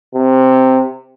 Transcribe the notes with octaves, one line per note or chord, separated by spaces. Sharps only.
C3